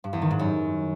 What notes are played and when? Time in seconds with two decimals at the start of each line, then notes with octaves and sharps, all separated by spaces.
0.04 G2
0.13 E2
0.22 D#3
0.31 G#2
0.39 F#2